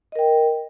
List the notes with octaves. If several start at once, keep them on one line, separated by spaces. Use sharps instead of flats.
A#4 D#5 G5